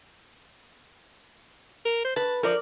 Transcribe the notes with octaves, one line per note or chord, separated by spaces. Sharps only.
A#4
C5
B4 A5
F3 A#4 D5